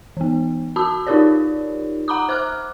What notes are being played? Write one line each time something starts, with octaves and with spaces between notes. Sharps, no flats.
E3 B3
F#4 A5 B5 D#6 E6
D#4 F4 G4 A#4 C#5 D5
F#5 A#5 B5 D6 D#6
C5 D6 F6 F#6